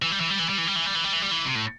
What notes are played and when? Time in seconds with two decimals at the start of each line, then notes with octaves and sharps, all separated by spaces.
0.02 E3
0.12 G3
0.21 E3
0.30 G3
0.39 E3
0.49 G3
0.58 E3
0.67 G3
0.76 E3
0.86 G3
0.95 E3
1.04 G3
1.13 E3
1.22 G3
1.31 E3
1.45 C3
1.55 A2